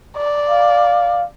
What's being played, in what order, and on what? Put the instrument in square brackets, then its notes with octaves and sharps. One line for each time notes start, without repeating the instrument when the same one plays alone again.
[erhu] D5
[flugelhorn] F5